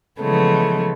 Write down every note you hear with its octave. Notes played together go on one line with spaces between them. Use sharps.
C#3 E3 F3 G#3 A3 B3